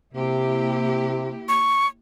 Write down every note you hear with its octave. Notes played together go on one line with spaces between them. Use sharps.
C3 A#3 E4 G4
C#6